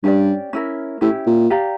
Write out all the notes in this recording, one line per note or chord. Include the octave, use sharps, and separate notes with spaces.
G2 C#4 G4 D5
C#4 E4 A#4
A2 C#4 E4 G4
A#2
G4 D5 F5 A#5